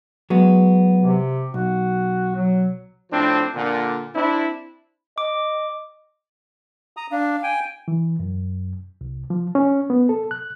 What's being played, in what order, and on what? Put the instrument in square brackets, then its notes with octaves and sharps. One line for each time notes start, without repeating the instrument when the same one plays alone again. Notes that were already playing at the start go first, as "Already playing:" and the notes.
[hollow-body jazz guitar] F#3 G#3 B3
[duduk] C3
[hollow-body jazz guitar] B1 [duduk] F#4
[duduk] F#3
[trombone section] A2 F3 C4 D4
A#2 D3
C4 D4 E4
[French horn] D#5 [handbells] D6
[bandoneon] A#5 D#6
[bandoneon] D4 [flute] F5
[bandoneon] G5 G#5
[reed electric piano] E3
F#2
C2
F3
C#4
B3
A4
F#6